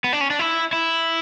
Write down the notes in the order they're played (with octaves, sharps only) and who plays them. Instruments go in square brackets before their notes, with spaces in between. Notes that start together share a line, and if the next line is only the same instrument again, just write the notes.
[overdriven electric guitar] B3
D4
C#4
D4
E4
E4